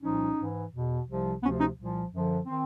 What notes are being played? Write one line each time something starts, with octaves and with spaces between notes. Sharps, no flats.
C2 A#2 F3 C#4 D#4
G#2 E3
E2 B2
C2 C3 F3
D2 C3 F3 B3 C#4
C#4 D#4
C2 A#2 F3
F#2 D3 F3
D#3 C4